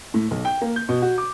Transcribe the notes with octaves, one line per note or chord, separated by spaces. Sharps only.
A2
B1
G5
A#3
G6
B2
F#4
D6